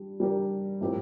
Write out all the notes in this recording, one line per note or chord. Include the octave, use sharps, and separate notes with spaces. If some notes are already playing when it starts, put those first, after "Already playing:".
Already playing: G3 D4 G4
G3 D4 G4 A#4
A2 F3 C4 G4 A#4